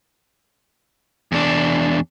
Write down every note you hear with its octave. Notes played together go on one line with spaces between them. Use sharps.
E2 D4